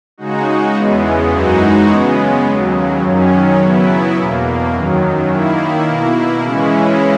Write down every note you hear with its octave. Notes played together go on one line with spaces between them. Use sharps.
C#3 G#3 D#4 F#4
E2 C#3 E3 G#3 B3
F#2 E3 G#3 D#4 F#4
C#3 G#3 B3
D#2 C#3 F#3
F#2 D#3 F#3 C#4
C#3 F#3 B3 E4
E2 B2 A#3
F#2 D#3 F#3
D#3 A#3 E4
B2 A#3 E4
C#3 E3 G#3 C#4 E4